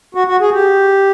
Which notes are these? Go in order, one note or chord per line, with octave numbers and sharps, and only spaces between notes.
F#4
F#4
G#4
G4